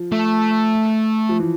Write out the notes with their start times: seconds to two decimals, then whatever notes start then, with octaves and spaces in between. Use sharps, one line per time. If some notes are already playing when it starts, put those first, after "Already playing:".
Already playing: F3
0.12 A3
1.29 F3
1.40 E3